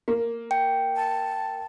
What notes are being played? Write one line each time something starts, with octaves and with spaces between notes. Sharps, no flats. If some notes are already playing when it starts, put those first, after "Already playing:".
A#3
G5
A5